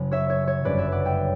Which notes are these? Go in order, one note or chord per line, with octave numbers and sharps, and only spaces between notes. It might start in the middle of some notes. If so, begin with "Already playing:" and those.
Already playing: F#1 F#2 C#3
C#5 E5
C#5
C#5
G1 F#2 C#3 B4 D5
C#5 E5
D5 F#5
E5 G5